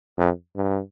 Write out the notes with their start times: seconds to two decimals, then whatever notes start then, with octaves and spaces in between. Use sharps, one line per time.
0.18 F2
0.56 G2